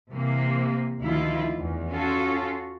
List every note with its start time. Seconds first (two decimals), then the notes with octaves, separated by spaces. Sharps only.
0.11 C3 E3 A#3
1.01 D2 D#3 F3 E4 F4
1.59 E2
1.90 C#4 F4 F#4 A4